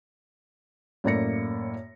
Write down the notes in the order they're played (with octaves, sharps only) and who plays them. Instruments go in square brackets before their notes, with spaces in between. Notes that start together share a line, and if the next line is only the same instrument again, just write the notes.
[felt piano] F#2 A2 A#3 D5 A#6 C#7